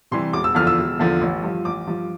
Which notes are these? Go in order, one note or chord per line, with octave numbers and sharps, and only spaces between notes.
C3 E3 G3 C6
E1 D6
E6
E2 D3 F3 F6
E6
E1
E2 D3 F3
A1
G2 F3
A1 D6
G2 F3